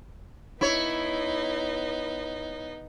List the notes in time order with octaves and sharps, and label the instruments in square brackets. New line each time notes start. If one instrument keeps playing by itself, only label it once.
[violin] B3 D#4 [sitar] E4 C#5